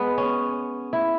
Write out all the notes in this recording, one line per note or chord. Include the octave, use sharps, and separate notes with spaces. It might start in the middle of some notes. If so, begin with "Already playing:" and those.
Already playing: G#3 B3
C#4
E4